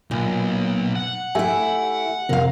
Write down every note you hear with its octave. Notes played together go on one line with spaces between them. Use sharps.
B1 A#2
F#5
A3 E4 G4 E5 G#5
F2 C3 A#4 F5